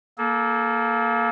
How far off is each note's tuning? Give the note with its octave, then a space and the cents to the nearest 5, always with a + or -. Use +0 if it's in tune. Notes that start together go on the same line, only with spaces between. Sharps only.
A#3 +5 A4 -30